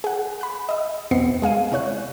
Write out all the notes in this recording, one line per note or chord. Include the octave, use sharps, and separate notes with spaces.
G#4 F#5
B5 F#6
D#5 E5
B1 E2 B3 C4 C7 C#7
G#3 G#4 F5 D#7
C3 E4 C#5 F#6